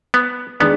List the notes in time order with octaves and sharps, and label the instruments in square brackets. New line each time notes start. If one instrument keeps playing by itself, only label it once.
[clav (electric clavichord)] B3
[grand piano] D#3 G#3 D4 [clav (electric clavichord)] B3